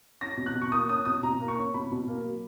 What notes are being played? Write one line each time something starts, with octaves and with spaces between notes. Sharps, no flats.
C#4 A#6
B2
F#6
B2
C#6
A#3 D#6
C#4 D#6
B2 D#6
B2 A#5
A#3
C#6
C#4
B2 B5
B2
A#3
F#3